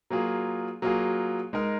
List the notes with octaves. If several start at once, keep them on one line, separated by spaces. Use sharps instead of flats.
F#3 A#3 F4 G#4
F#3 A#3 F4 G#4
G#3 D#4 A#4